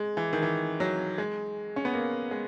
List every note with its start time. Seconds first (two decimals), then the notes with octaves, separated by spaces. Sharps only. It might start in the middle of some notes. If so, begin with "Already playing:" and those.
Already playing: G#3
0.17 E3
0.33 D#3
0.42 E3
0.80 F#3
1.18 G#3
1.76 C#4
1.85 B3
1.94 A#3
2.31 G#3